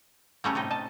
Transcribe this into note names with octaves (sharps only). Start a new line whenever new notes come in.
G3 A3 A#3 C#4 G#4 A#5
A2 C3 D#4 G5
D#5 A5